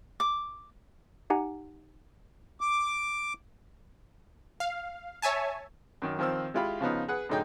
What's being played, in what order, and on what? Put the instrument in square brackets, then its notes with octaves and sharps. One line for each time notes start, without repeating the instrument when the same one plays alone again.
[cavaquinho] D6
[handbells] D#4 G4 F#5 G#5 A#5
[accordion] D6
[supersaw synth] F5
C#5 E5 G#5 A5
[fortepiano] F#2 D#3
D#3 F3 C4 C5 E6
G#3 E4 F4 G4 B5
C#3 F3 B3 D#4
G#4 B4 F#5
F#2 A2 D3 D#4 G#4 G5